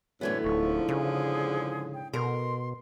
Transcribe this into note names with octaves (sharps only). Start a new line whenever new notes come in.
F#2 A2 D3 E3 A3 B3 C#5
D1 G#2 D3 F3 C#6
E2 C#3 G#4
G5
B2 A#4 A#5 C6